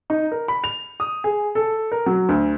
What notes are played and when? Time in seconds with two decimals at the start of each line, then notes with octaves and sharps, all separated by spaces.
0.10 D#4
0.32 A#4
0.48 B5
0.64 F7
1.00 D#6
1.24 G#4
1.55 A4
1.92 A#4
2.06 F#3
2.29 D2